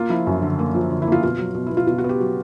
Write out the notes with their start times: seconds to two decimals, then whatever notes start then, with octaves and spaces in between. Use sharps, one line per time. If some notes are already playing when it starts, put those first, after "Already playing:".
Already playing: A#3 F4
0.10 F3 E4
0.27 F#2
0.42 D3
0.59 A#3
0.75 F3
0.90 D3
1.02 E4
1.07 A#3
1.12 F4
1.23 B2 F4
1.39 F#3
1.55 B2
1.66 E4
1.72 B2
1.77 F4
1.87 B2 F4
1.98 F#4
2.04 B3
2.09 G4
2.20 F#3